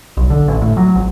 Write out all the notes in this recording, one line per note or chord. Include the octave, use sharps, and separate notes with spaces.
B1
D3
A1
A2
F#3
G#1